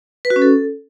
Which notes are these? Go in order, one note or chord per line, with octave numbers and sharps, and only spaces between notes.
B4
F#4
C#4
A4